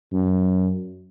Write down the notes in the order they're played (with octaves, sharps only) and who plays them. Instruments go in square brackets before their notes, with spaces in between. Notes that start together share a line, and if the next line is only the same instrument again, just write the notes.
[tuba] F#2